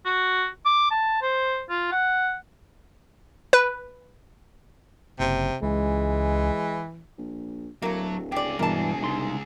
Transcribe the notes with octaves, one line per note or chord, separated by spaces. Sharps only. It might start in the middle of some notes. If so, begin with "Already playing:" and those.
F#4
D6
A5
C5
F4
F#5
B4
F#1 C3
C#2 E3 G#3
A#1
D1 F#3 A3 A#3
C#2 G4 G#4 D5
E1 G2 B2 E3 A#4 A5
C2 D#4 C6